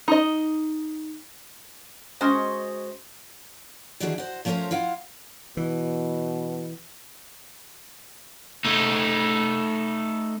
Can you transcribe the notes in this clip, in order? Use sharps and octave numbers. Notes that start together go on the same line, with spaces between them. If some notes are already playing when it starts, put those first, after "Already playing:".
D#4 D#5
G#3 C#4 F#4 C5 D#5
D#3 E3 G3 D4 F#4 G#4
F#4 C5
F3 A3 C#4 A#4 C5 C#5
E4 F4 F5 F#5
B2 E3
A3 D#4